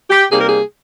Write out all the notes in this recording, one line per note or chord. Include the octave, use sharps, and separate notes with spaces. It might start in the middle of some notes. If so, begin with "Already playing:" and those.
G4
C3 G3 A#3 D#4 G#4
A#4
G#4